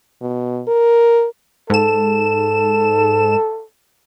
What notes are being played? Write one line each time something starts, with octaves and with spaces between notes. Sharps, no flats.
B2
A#4
G#2 A4 E7